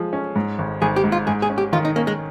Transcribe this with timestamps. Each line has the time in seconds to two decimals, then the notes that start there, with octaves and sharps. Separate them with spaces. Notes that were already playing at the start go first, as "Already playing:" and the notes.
Already playing: F3 G#3
0.13 C#4
0.36 G#2
0.58 G#1
0.82 G#1 G#4
0.96 G4
1.04 G#2
1.12 F4
1.27 G#2 G#4
1.42 G#4
1.50 C#4
1.58 G4
1.72 D#3 F4
1.85 D#4
1.96 A#3 C#4
2.07 G#3